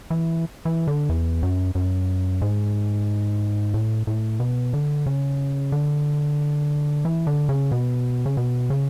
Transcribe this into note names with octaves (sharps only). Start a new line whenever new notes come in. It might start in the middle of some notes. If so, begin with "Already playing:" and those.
E3
E3
D3
E2
F#2
F#2
G#2
A2
A2
B2
D3
C#3
D3
E3
D3
C#3
B2
C#3
B2
C#3